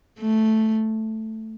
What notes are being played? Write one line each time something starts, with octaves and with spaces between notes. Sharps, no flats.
A3